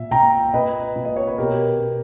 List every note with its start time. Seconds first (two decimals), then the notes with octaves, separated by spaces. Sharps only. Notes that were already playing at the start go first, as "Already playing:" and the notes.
Already playing: A#2 E5
0.11 A#2 G5 A#5
0.54 A#2 B4 D#5
0.96 A#2
1.05 D#5
1.16 C#5
1.27 B4
1.38 B2 G4 A#4
1.80 B2